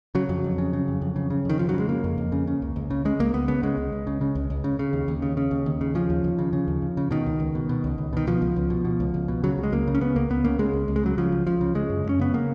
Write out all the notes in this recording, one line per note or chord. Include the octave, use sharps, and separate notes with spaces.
C#3 F#3
F2
F2
C#3
C#3
F2
F2
C#3
C#3
F2 D#3
F2 F3
F#3
C#3
G#3
C#3 A#3
F2
F2
C#3
C#3
C#2
C#2
C#3
C#3 G#3
C#2 A#3
C#2 B3
C#3 B3
C#3 G#3
C#2
C#2
C#3
C#3
C#2
C#2
C#3
C#3
D#2
D#2
C#3
C#3
D#2
D#2
C#3
C#3 F3
D#2
D#2
C#3
C#3
D#2
D#2
C#3
B2 D#3
C#2
C#2
B2
B2
C#2
C#2
B2 D#3
B2 F3
C#2
C#2
B2
B2
C#2
C#2
B2
C#3 F#3
C#2
G#3
C#2 A#3
C#3
C#4
C#3 B3
C#2 A#3
C#2 B3
C#3 A#3
C#3 G#3
C#2
C#2
G#3
C#3 F#3
C#3 F3
C#2
C#2 F3
C#3
C#3 G#3
F#2
F#2 C#4
C#3 B3
C#3 A#3